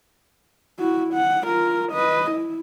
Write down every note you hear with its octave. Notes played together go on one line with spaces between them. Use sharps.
E4 F#4
F#5
F4 A#4
B4 D#5
E4